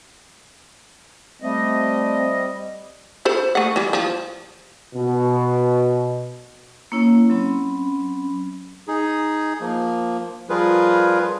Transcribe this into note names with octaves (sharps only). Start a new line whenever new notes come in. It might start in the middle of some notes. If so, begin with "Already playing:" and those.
G3 A3 C4 D#5
A4 C5 B5
A3 F#5
E3 G3
F3
B2
A#3 C#4 E4 C#5 E6
F#3 C4 C#4 B5
D#4 G#4
F3 A#3
F3 G3 F4 G#4 A#4 B4